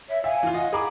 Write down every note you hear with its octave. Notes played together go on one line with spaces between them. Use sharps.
C#5 E5
E5 F5 G#5
E3 F4
D#5 F5 F#5
G#4 A#5 B5 D6